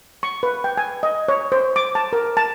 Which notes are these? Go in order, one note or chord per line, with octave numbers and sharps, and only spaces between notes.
C#6
B4
G5
G#5
D#5
C#5
C5
D6
A5
A#4
A5